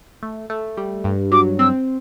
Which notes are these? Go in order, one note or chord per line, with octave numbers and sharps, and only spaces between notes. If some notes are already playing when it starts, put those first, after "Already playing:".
A3
A3
G3
G2
F#3 D6
C4 E6